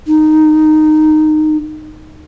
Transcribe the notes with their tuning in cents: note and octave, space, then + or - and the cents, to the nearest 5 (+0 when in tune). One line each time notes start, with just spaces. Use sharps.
D#4 -10